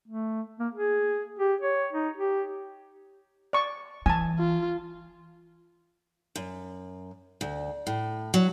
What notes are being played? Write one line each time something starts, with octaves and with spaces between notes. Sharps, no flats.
A3
A#3
G#4
G4
C#5
D#4
G4
D5 C#6
E3 G#5 A5
F4
F#2
D2
A2
F#3